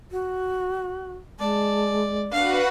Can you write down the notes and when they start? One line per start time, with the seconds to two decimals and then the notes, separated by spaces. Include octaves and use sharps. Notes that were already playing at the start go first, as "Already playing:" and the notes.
0.12 F#4
1.40 G#3 D5 A5
2.32 D4 F#4 B4 F5 F#5